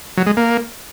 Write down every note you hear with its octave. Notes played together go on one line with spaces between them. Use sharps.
F#3
G#3
A#3